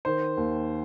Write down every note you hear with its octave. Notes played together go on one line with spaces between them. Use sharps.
D#3 C5
D#2